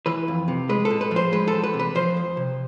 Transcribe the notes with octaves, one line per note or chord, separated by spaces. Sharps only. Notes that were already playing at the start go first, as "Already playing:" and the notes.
E3 B4
F2
C3
G#3 B4
A4
A2
B4
F3
C5
G#3 B4
A4
E2
B4
C3
B4
F3 C5
F2
C3